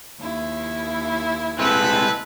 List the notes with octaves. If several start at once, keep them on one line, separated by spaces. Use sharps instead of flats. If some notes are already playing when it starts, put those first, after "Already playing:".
D#2 E4
C2 G#3 C4 A4 B4